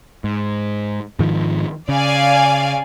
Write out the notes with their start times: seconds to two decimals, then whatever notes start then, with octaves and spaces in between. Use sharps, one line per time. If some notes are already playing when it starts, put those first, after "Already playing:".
0.24 G#2
1.19 G#2 D#3 F3
1.89 C#3 D5 F5 G#5